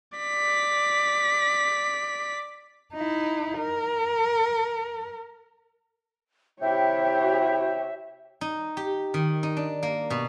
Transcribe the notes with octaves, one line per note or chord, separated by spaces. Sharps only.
D5 B6
D#4 E4
A#4
C3 E4 G4 C#5 E5 G5
D#4
G4
D#3
D#4
D4
A#3
B2